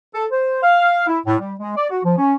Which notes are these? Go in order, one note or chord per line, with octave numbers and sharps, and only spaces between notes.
A4
C5
F5
E4
A2
G3
G#3
D5
F#4
F3
C#4